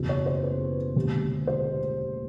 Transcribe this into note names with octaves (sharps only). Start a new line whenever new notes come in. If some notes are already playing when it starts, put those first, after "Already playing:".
Already playing: F#1 E2 B2
C#5
C5
B4
E1 D#2 D3
C5